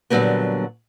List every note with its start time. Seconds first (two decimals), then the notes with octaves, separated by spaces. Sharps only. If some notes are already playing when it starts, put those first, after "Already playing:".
0.10 A#2 D3 F#3 G3 A#3 B3